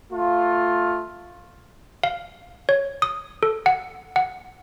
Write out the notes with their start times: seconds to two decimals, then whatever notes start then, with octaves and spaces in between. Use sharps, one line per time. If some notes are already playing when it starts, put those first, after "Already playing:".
0.11 A3 F4
2.04 F5
2.69 C#5
3.02 D#6
3.43 A4
3.66 F#5
4.16 F#5